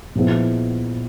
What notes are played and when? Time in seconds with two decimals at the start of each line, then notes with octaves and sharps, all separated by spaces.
0.15 A#2 F3 G#3 B3 E4